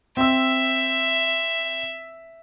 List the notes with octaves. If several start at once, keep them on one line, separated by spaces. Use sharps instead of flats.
C4 E5 E6